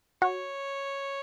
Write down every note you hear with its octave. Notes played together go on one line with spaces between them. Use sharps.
F#4 C#5